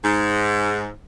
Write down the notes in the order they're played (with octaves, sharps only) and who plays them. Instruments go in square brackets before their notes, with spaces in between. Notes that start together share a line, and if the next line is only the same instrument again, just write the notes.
[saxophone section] G#2